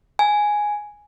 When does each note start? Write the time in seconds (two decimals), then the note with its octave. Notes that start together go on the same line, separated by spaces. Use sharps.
0.19 G#5